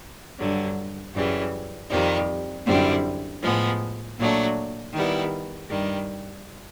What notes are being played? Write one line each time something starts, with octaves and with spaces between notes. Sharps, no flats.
G2 D3 F#3
F#2 C#3 E3 G3
F2 C3 D#3 G3
F#2 D3 G3 C4 E4
A2 F3 G#3 B3
A#2 F#3 A3 D4
D#3 G3 B3 E4
G2 D#3 G3